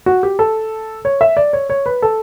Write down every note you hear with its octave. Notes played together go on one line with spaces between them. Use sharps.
F#4
G4
A4
C#5
E5
D5
C#5
C#5
B4
A4